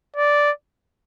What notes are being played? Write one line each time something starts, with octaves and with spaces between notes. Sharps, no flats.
D5